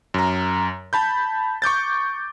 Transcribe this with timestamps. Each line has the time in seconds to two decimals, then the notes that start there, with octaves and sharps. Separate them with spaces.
0.14 F#2 A#5
0.93 A5 B5 G6
1.62 C#6 D6 G6 A6